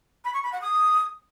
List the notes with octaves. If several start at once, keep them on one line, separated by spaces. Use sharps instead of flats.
B5
C#6
B5
F#5
D#6